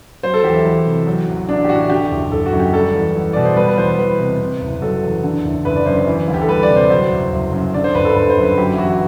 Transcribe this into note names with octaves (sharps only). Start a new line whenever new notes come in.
F#3 C5
A4
E2 G4
E4
E2
C3
F#3
A1
A1 D4
G4
A2 F#4
F#4
D3 G4
F#1
F#1 A4
F#4
F#2
G4
G3 A4
E2
E2
B2 D5
C5
G3 B4
B4
E2 C5
E2 B4
C3
C3
F#1
F#3 A4
E2
D3
F#1
F#1 B4
D5
F#2 C5
B4
E3
D2
G4
A4
G3 B4
D5
C3
C5
F#3 C5
F#1
F#1
F#2
D3 D5
C5
G1 B4
A4
G1 B4
C5
F#2
B4
F#3 G4
E4
A1 F#4